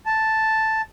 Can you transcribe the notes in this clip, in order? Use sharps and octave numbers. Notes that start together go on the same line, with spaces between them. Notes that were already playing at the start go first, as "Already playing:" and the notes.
A5